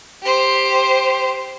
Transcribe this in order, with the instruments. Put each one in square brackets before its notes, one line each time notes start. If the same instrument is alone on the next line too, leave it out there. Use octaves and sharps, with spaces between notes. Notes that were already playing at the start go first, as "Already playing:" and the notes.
[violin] G4 C5